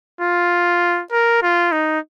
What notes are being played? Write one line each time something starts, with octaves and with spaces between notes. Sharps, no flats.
F4
A#4
F4
D#4